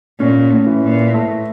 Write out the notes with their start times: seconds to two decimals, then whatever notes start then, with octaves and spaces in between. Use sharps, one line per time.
0.20 A#2 C#4
0.51 A2
0.66 E3
0.83 A#2
1.14 A2 A3